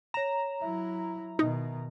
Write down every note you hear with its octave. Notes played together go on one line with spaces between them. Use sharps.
C#5 A#5 E7
F#3 E4 E5
B2 D#3 D#4